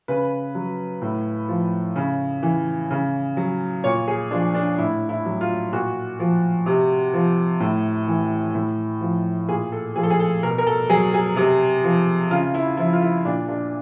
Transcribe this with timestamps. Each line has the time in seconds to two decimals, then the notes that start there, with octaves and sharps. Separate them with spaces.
0.08 C#3 B4
0.55 F#3
1.02 A2
1.49 F3
1.96 C#3
2.43 E3
2.91 C#3
3.37 F#3
3.84 A#2 C#5
4.08 G#4
4.31 F3 D4
4.55 D4
4.78 A2 E4
5.09 E4
5.26 F#3
5.41 F4
5.72 A#2 F#4
6.20 F3
6.66 C3
7.14 F3
7.60 A2
8.08 E3
8.55 A2
9.01 F3
9.49 A#2 G#4
9.72 A4
9.96 F3 G#4
10.03 A4
10.10 G#4
10.20 A4
10.43 B2 A#4
10.58 A#4
10.67 A4
10.90 F#3 G#4
11.14 G#4
11.36 C3
11.84 F3
12.31 C#3 F4
12.54 E4
12.77 F3 E4
12.93 F4
13.02 E4
13.25 A#2 D4
13.49 D4